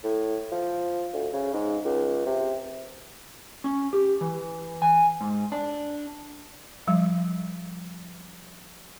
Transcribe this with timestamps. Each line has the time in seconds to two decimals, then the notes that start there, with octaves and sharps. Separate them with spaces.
0.04 A2
0.52 F3
1.13 D2
1.33 C#3
1.53 G#2
1.85 C#2
2.26 C3
3.64 C#4
3.93 G4
4.21 E3
4.82 G#5
5.21 G#2
5.52 D4
6.87 F3 G3